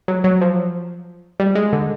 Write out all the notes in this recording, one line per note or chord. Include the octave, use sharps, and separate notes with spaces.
F#3
F#3
F3
G3
G#3
D3